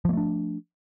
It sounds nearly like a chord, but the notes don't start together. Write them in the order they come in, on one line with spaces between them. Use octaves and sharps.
F3 A#3 A3 D4